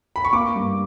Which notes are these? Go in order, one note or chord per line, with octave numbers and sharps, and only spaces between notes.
B5
C#6
A#3 D6
G2